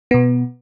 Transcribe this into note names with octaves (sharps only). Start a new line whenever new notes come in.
B2 B3